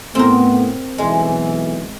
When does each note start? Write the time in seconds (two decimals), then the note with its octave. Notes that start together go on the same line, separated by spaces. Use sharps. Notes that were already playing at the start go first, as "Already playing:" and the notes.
0.15 A2 B3 C4 A#4
0.98 B1 E3 G#3